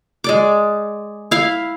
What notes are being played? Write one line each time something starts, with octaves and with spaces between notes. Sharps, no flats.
G#3 D5 D6
E4 F5